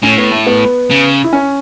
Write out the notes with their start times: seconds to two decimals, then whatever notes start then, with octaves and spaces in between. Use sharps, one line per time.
0.03 A2 C#4
0.18 B3
0.31 A3
0.47 B3
0.90 C#3
1.24 E4
1.33 C#4